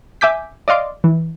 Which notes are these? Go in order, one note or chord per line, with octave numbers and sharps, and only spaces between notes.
E5 G#5 D6 G6 B6
D5 D#5 F5 C6 D6
E3